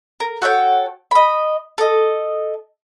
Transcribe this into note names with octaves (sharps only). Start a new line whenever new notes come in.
A#4
F#4 A4 C#5 G5
D#5 B5
A4 D#5